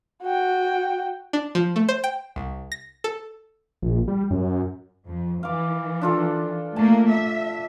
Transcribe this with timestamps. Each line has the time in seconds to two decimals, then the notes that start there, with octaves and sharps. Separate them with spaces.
0.23 F#4 G5
1.33 D4
1.55 F3
1.76 A3
1.89 C5
2.04 G5
2.36 C2
2.72 A#6
3.04 A4
3.82 A#1
4.08 G3
4.30 F#2
5.08 F2
5.43 E3 F5 D6
6.02 D4 F4 A4
6.76 A3 A#3 A5
7.12 E5